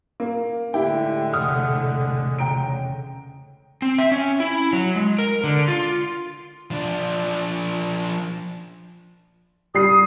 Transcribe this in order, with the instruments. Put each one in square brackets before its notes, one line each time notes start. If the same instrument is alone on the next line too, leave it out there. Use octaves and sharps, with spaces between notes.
[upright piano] A#3
[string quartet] A2 D3 G#3 [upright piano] E4 G4 [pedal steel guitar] G5
[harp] E1 C3 [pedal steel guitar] F#5 D#6 F6
[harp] C#3 [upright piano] G5 A#5 D7
[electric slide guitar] C4
E5
C#4
E4
F#3
G#3
A#4
D3
F4
[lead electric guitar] F3 D4
[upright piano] G3 C7 [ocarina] D#6